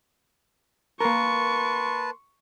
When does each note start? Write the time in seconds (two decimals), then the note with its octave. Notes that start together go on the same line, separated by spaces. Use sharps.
1.01 A#3 A#4 B4 A5 C6 C#6